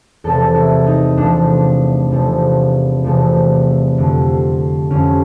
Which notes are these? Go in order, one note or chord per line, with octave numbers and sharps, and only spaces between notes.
E2 C3 F3 A3 A4
E4
D#4
E2 C3 F3 A3 D4
E2 C3 F3 A3
E2 C3 F3 A3
F2 D3 G3
F2 D3 G3 C#4